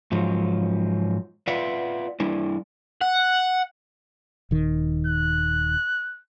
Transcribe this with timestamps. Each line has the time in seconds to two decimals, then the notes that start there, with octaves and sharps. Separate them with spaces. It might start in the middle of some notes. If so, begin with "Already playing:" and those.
0.12 G#2 F3 F#3
1.48 F4 B4 D5 E5 F#5
2.20 G3 D4 E4
3.01 F#5
4.51 D#1 D#3
5.07 F#6